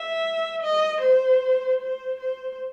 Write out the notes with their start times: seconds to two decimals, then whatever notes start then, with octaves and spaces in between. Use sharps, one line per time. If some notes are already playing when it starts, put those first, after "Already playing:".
Already playing: E5
0.62 D#5
1.01 C5
1.81 C5
2.20 C5